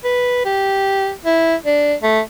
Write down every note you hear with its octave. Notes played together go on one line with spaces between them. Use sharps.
B4
G4
E4
D4
A3